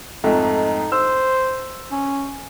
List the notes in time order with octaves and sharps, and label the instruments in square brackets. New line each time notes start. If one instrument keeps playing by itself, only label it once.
[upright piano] F2 G#2 A3 [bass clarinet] D#4
[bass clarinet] C5 [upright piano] E6
[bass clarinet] C#4